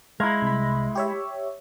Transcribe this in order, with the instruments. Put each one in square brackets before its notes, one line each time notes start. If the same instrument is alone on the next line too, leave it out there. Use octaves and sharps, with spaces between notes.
[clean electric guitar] G#3 E4 [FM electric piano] F5 A#5 G#6
[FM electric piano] C2 B5
G4 C#5 E5